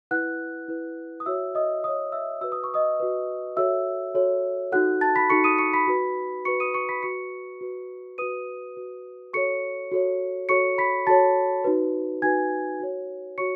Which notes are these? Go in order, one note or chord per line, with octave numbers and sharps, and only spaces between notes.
E4 B4 F#5 F#6
E4 B4
D#6
F#4 C#5 E5 E6
D#5 D#6
F#4 C#5 D#5 D#6
E5 E6
F#4 B4 E6
D#6
C#6
D#5 D#6
F#4 B4
F#4 A4 C#5 E5 E6
F#4 A4 C#5
D#4 F#4 A4 F#5 F#6
A5 A6
B5 B6
D#4 F#4 A4 C#6 C#7
D#6 D#7
C#6 C#7
B5 B6
F#4 B4
F#4 B4 C#6 C#7
D#6 D#7
C#6 C#7
B5 B6
F#4 B4 C#6 C#7
F#4 B4
F#4 B4 D#6 D#7
F#4 B4
F#4 A4 C#5 C#6 C#7
F#4 A4 C#5
F#4 A4 C#5 C#6 C#7
B5 B6
F#4 A4 C#5 A5 A6
D#4 F#4 B4
D#4 F#4 B4 G#5 G#6
F#4 C#5
F#4 C#5 C#6 C#7